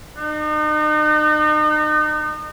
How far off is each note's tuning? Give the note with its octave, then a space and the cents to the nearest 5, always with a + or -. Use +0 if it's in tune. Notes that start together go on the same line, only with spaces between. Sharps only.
D#4 -40